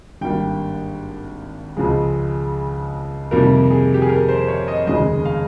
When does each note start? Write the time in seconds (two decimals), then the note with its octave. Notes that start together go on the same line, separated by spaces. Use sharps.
0.21 G#1 G2 G3 A#3 G5
1.77 C#2 C#3 F3 G#3
3.31 F2 C3 D#3 G3 A#3 A#4
3.71 G#4
3.94 G4
4.02 G#4
4.09 A#4
4.29 C5
4.48 C#5
4.68 D#5
4.87 F1 D#2 C#3 G#3 D#5
5.25 F5